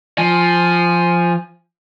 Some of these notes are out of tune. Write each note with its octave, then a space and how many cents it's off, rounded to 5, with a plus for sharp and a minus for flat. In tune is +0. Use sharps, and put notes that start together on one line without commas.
F3 +0 G#5 +0